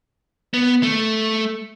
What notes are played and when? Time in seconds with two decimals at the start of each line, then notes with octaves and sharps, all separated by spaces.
0.54 B3
0.83 A3